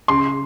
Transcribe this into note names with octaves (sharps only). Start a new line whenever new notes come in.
C#3 C6